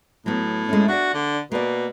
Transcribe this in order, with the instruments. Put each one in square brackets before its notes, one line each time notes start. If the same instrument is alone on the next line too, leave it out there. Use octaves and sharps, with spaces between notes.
[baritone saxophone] A2 [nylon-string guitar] F#3 B3
[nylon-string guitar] G#3 A3 C#4
[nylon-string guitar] D4 D5 [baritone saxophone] F#4
[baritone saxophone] D3
[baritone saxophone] B2 [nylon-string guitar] A#3 D5